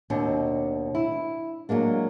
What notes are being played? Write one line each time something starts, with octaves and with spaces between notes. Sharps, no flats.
D#2 B2 C4 D4
E4
F#3 G#3 A#3 D4